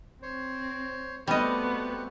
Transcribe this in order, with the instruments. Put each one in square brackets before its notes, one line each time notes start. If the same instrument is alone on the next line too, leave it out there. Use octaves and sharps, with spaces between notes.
[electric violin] C4 [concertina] C5 C#5
[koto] G3 D#5 [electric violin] A3 B3 [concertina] C4 F#4 G4